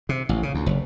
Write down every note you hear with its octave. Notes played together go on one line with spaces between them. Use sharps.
C3
A1
C#3
D2
F#1